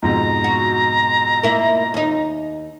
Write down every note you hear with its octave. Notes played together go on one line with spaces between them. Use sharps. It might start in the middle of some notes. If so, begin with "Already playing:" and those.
F2 G#2 B2 A#5
F#4
A#3 E4 A#4
D#2 D#4